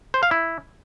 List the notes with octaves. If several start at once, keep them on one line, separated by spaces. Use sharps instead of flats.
C5
F5
E4